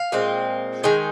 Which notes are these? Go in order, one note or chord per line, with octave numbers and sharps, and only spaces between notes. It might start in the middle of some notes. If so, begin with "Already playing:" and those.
Already playing: F5
A#2 G#3 C4
D#3 G#3 D#4 G#5